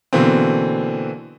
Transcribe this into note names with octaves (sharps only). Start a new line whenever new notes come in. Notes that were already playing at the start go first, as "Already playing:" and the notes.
B2 D3 E3 A#3 C4